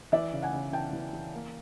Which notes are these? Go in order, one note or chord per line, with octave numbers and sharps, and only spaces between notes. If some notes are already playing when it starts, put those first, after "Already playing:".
E3 D5 E5
C#3
F#5 G#5
C#3
E3 G5 A5
E3
E3
A#3